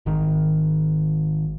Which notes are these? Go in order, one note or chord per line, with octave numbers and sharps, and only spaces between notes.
G#1 D#3